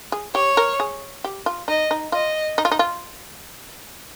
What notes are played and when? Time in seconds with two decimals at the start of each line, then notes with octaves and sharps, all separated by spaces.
0.12 G#4
0.35 G4 C#5
0.57 A#4
0.80 G#4
1.24 G4
1.46 F4
1.68 D#4 D#5
1.91 D#4
2.12 F4 D#5
2.58 D#4
2.65 F4
2.71 D#4
2.79 F4